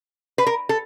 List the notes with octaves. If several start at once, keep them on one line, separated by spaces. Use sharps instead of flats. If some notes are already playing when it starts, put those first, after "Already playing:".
B4
A#4
A4